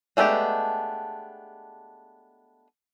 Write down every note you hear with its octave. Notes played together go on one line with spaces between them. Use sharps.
G#3 A3 B3 D4 G4